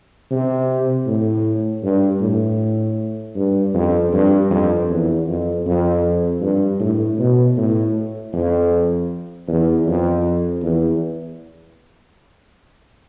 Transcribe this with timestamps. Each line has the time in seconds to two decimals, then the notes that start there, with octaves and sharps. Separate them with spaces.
0.31 C3
1.07 A2
1.84 G2
2.21 A2
3.36 G2
3.74 F2
4.13 G2
4.50 F2
4.89 E2
5.27 F2
5.66 F2
6.42 G2
6.80 A2
7.19 B2
7.57 A2
8.33 F2
9.47 E2
9.87 F2
10.63 E2